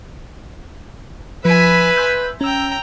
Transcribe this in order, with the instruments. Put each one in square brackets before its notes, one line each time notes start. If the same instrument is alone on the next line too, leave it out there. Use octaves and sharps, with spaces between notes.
[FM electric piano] F3 [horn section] B4 [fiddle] E5 G#5
[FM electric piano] C6 E6 G6
[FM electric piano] C#4 E6 [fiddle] G5 A#5